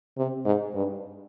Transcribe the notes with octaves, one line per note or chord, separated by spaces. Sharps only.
C3
G#2
G2